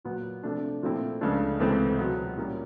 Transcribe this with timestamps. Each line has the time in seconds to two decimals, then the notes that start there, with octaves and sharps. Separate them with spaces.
0.05 A#2 F#3 B3
0.43 C3 F3 A3 D4
0.82 A#2 F3 A3 C4 E4
1.21 C#2 C#3 F3 A3 D4
1.60 C#2 C3 E3 A3 C4
1.98 B2 F#3 B3
2.37 A#2 G3 A#3 C#4 E4